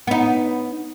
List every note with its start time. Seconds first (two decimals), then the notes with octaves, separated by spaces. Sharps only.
0.07 B3 D#4